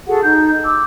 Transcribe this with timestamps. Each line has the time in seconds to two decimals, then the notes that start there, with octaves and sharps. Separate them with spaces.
0.08 F#4 G#4 A4 F#5
0.22 D#4 G6
0.64 D6 E6